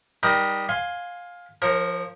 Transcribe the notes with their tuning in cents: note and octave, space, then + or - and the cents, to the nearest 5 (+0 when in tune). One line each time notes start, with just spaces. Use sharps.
G3 +0 D#4 +0 A#4 +25
F5 +15 G#5 +0 C6 +0
F3 +0 A#4 +0 C#5 -45